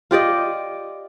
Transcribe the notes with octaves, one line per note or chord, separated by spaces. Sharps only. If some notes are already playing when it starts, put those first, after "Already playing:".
F4 G4 D5 D#5